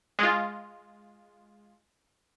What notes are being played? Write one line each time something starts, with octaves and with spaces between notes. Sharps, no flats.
G#3 F4